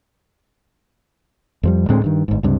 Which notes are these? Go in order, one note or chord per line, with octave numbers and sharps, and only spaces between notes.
F2 F3 G3
D2 A2 G#3 C4
G2 D#3
G1 G#2
C#2 G2 C3